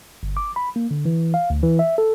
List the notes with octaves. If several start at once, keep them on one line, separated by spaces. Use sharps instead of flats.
G1
D6
B5
A#3
D3
E3
F5
D2
E3
E5
A4